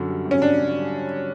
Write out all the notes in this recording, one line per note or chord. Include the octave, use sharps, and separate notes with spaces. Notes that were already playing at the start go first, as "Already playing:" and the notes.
Already playing: F#2 D3
G3
G#1
C#4
F#2 D4
D3
G3